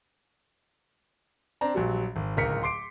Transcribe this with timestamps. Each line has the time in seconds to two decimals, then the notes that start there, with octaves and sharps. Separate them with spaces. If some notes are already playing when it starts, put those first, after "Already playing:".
1.61 C4 D4 A#5
1.75 A#1 F#3 G3
2.16 G#1
2.37 D1 C#2 A#4 B6 C#7
2.63 C6 D6 C7 D7